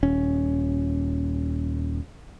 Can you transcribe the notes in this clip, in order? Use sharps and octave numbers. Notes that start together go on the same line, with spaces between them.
D#1 C#4